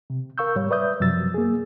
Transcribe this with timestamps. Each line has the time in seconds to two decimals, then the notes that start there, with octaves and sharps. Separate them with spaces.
0.10 C3
0.38 A#4 F5 C#6 E6 G6
0.56 G#2 G3 C#5
0.71 B4 D5 E5 D#6 G6
1.00 F#2 C3 F3 F#3 E6 A6
1.34 A#3 G#4